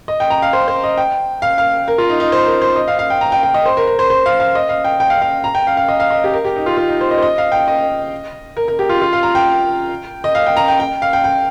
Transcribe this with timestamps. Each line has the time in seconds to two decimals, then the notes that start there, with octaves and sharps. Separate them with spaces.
0.08 D#5
0.20 G5
0.30 A#5
0.42 F5
0.53 C5
0.68 C5
0.84 D#5
0.98 G5
1.42 F5
1.58 F5
1.88 A#4
1.98 F4
2.10 D#4
2.20 D#4
2.32 C5
2.46 A#4
2.62 C5
2.76 D#5
2.88 F5
2.99 F5
3.10 G5
3.21 A#5
3.32 G5
3.43 G5
3.54 D#5
3.66 C5
3.77 A#4
3.87 A#4
3.99 C5
4.10 C5
4.26 F5
4.40 F5
4.55 D#5
4.69 F5
4.84 G5
5.00 G5
5.10 F5
5.22 F5
5.44 A#5
5.55 G5
5.67 F5
5.77 F5
5.88 D#5
6.00 F5
6.10 D#5
6.24 G4
6.34 A#4
6.45 G4
6.56 D#4
6.66 F4
6.77 F4
6.88 D#4
7.01 C5
7.11 D#5
7.18 C5
7.22 D#5
7.38 F5
7.52 G5
7.68 D#5
8.57 A#4
8.68 A#4
8.79 G4
8.89 F4
9.02 F4
9.13 F5
9.23 A#5
9.35 G5
10.24 D#5
10.35 F5
10.46 G5
10.57 A#5
10.68 G5
10.80 G5
11.02 F5
11.13 G5
11.24 G5